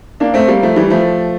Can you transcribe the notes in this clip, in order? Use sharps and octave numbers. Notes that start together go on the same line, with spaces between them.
A#3 D4
A3 C4
G3 A#3
F3 A3
E3 G3
F3 A3